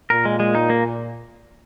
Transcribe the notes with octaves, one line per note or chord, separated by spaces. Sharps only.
A#2 A#4
G#3
G#3
D#4
A#3